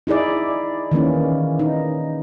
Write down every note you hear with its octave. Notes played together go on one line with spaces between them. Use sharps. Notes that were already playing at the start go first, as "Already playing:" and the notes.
D#4 E4 G#4 D5
D#3 E3 A#3 C#4
D#4